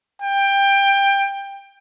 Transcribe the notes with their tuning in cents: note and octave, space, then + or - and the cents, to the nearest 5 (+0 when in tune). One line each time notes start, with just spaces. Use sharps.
G5 +20